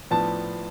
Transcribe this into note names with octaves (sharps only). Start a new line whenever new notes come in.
A2 F3 B3 D4 A5